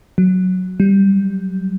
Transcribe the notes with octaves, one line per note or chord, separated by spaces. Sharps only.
F#3
G3